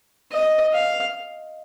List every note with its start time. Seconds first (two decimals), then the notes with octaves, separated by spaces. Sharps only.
0.32 D#5
0.73 F5